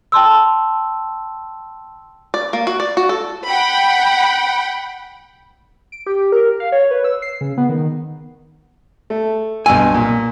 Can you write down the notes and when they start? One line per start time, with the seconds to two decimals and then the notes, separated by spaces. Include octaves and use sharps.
0.12 G5 A5 C6 E6
2.34 D5
2.53 A#3
2.67 F#4
2.80 D5
2.97 F#4
3.09 A4
3.48 F#5 G5 B5
5.92 D7
6.06 G4
6.32 A#4
6.60 F5
6.72 C#5
6.91 B4
7.04 E6
7.22 C7
7.41 C#3
7.58 B3
7.69 D#3
9.10 A3
9.66 B1 G2 G#5 E6
9.94 A#2